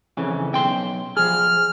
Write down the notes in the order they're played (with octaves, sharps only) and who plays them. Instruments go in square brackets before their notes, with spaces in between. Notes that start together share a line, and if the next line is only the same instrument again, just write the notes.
[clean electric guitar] F2 C#3 E3
B1 G5 C6
[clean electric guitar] F3 G#4 [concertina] F6